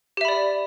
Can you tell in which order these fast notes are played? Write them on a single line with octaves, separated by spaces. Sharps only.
G4 E5 B5 D5